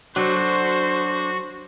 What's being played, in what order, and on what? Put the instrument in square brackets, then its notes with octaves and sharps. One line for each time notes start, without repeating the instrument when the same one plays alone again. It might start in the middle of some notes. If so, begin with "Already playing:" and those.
[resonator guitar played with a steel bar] F#3 [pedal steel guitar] D4 A4 [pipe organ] F#4 [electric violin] C5